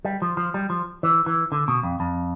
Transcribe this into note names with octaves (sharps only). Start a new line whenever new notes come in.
G3
F3
F3
G3
F3
E3
E3
D3
B2
F2
F2